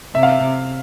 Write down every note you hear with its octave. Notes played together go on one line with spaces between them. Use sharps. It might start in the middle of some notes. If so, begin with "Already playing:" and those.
C3 E5
F5
E5